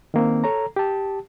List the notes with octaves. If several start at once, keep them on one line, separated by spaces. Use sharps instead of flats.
D#3 A#3 C4
A4 C#5 A#5
G4 A5